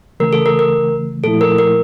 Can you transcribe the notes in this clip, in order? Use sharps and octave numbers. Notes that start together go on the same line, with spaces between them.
C#3 E3 A3 A#4
A4
A#4
A#4
A#2 F3 A3 E4 A4
A#4
A#4